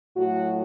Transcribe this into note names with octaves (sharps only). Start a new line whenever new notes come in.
A2 F#3 F#4